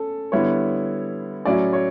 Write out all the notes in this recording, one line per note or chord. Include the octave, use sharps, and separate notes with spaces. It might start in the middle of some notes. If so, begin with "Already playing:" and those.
Already playing: C#4 A4
D3 G3 B3 E4 C#5
A2 F#3 C#4 E4 D5
C#5